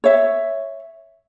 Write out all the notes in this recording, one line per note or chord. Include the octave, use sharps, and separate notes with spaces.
C#5 E5